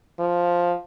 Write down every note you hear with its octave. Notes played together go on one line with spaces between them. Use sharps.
F3